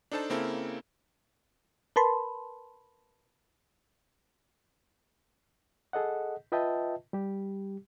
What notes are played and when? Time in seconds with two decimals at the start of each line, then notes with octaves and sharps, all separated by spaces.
0.12 D4 D#4 A4 C5 A5
0.30 C#3 A#3 C4 E4 A4
1.96 A#4 B4 A5 B5 C6
5.93 G#4 A4 D#5 F#5
6.52 F4 B4 D#5 E5 G5 A5
7.13 G3 G4